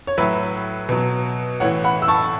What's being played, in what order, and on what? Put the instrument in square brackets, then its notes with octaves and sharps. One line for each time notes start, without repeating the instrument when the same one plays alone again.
[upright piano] C#5
A2 F#3 B4 E5
B2 F#3
A2 E3 C#5 F#5
F#5 B5
E6
A5 C#6